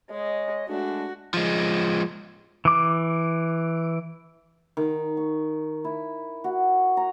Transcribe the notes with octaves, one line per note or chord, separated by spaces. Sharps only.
G#3 C#5 D#5
G#3 A3 D4 F#4
F3 G#3
E3 D6
D#3
C#6
E4
F#4
A#5